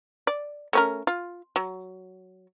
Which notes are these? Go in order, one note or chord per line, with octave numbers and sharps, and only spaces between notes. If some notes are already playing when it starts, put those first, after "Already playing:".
D5
A3 C#4 A#4
F4
F#3